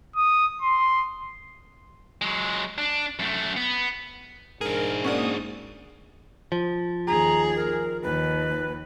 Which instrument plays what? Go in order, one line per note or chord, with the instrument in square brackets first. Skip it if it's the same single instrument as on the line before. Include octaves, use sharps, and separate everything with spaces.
[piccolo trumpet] D#6
C6
[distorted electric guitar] F#3 G#3
D4
F#2 A3
B3
[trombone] G#2 [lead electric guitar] D4 G#4 [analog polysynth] A#4
[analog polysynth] A#3 D#6 [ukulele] C#4 F#4 D5
[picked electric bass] F3
[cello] D#2 G#4 [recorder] A#5
[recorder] A#4
[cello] D#2 [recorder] B4